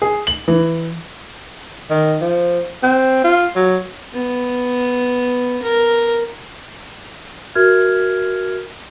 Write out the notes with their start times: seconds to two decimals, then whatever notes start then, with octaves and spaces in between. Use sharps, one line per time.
0.02 G#4
0.27 F#7
0.48 E3
1.90 D#3
2.21 F3
2.83 C4
3.24 F4
3.56 F#3
4.13 B3
5.62 A#4
7.55 F#4 A#4 E5 F6 G#6